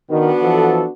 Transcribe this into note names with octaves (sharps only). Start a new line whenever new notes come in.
D#3 B3 D4 F#4
E3 F3 A4